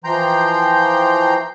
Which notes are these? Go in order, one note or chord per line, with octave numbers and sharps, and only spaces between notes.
E3 F3 G5 A#5 C6 G6